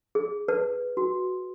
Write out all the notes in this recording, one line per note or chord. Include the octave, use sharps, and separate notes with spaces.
G#4
B4
F#4